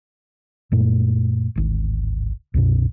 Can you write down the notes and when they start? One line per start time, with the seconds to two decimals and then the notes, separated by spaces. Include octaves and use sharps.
0.72 F#2 A#2 A3
1.55 D1 G#1
2.54 C2 F#2 B2